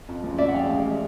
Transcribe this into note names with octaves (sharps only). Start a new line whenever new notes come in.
F2
C#2
C#2 D5 E5
F#5
G#3 F5 G5
A1
G#3